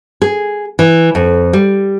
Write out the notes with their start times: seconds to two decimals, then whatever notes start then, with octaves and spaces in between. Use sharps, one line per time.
0.22 G#4
0.79 E3
1.15 F2
1.53 G3